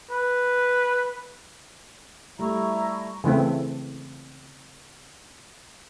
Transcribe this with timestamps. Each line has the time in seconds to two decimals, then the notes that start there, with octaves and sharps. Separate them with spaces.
0.11 B4
2.39 G3 A3 E4 A#5 C#6
3.24 C#3 E3 A3 C4